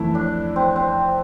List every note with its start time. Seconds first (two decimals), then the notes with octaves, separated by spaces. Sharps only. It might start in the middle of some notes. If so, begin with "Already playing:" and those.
Already playing: F2 E3 A3 E4
0.15 D4
0.56 C4
0.76 C4